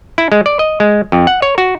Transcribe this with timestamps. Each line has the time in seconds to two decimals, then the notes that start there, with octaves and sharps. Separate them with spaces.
0.18 E4
0.32 G#3
0.46 D5
0.59 D#5
0.80 G#3
1.12 F2
1.27 F#5
1.42 C#5
1.58 F#4